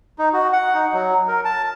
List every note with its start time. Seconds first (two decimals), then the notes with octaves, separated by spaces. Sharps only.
0.18 D#4
0.33 F#4
0.53 F#5
0.74 D#4
0.93 F#3
1.28 A#4
1.45 A5